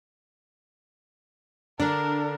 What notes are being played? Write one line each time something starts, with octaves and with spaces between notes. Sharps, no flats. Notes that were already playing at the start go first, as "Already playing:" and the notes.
D3 D4 A#4